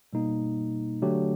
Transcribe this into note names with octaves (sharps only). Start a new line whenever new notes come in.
B2 G3 A#3 D#4
D3 F#3 A3 D4 G4